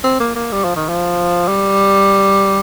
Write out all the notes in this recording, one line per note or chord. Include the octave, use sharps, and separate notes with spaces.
C4
A#3
A#3
G3
F3
D#3
F3
G3